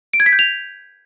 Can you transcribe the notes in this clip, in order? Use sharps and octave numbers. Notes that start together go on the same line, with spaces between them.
D7
G#6
B6
G6
F7